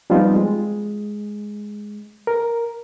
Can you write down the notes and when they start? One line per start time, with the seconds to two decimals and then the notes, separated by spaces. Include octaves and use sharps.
0.10 F3 G3 B3 C4 D#4 F4
0.36 G#3
2.27 A#4